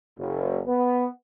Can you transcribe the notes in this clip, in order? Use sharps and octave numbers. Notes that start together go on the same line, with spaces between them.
F#1
B3